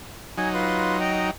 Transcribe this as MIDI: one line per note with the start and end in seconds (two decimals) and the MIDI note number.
0.38 1.31 54
0.38 1.31 63
0.38 0.49 80
0.54 0.97 65
0.54 0.97 71
0.54 0.97 84
1.00 1.29 75
1.00 1.29 79
1.00 1.29 82